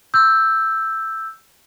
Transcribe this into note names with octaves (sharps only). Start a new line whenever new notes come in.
E6 G6